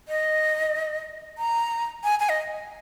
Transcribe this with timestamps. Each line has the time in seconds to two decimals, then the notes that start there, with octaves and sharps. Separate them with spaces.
0.08 D#5
1.38 A#5
2.04 G#5
2.20 G#5
2.29 D#5